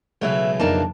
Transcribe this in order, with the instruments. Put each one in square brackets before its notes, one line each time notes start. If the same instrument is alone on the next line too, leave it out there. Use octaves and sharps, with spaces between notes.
[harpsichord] B1 C#3 E3 [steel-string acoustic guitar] A3 B4 E5
[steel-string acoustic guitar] F2 D4 A5 [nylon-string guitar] A#3 D#4 A#4